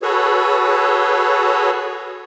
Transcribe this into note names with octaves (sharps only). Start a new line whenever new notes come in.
F#4 G#4 A4 B4 C#5